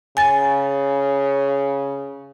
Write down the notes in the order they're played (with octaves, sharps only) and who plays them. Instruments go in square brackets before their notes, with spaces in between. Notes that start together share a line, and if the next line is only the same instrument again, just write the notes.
[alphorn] C#3 [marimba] G#5 A6